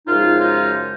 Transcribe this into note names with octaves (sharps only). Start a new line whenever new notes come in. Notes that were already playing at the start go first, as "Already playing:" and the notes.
F#2 C#3 F3 G#3 D#4 F4
D#4 F4